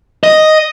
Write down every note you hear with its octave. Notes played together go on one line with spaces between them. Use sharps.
D#5